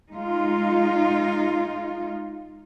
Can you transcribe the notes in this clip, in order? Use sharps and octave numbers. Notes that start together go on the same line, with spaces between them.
G#3 D#4 F4